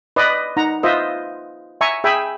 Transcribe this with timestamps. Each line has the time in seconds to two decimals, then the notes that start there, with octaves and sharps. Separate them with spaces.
0.16 B4 D5 D#5
0.57 D#4 F#5 A#5
0.83 F4 B4 C5 D#5 E5
1.81 E5 G#5 A#5 C#6
2.04 G#4 E5 G5 G#5 B5